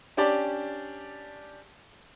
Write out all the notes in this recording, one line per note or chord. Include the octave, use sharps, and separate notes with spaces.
C#4 D4 G4 D5 A5